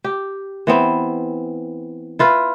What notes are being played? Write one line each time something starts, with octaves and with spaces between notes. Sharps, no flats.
G4
E3 B3 C4
E4 F4 B4